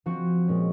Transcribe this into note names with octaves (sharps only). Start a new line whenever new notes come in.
F3 C4 F#4
A#2 G#3 C#4